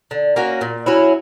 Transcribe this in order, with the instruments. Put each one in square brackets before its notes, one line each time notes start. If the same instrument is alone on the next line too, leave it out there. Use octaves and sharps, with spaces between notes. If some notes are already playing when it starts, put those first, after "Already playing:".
[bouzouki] D3
A#3 C#4 F#4
A#2
F#3 C#4 E4